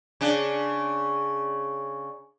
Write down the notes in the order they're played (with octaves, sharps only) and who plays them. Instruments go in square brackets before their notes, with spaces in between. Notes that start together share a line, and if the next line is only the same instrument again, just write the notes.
[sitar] C#3 D4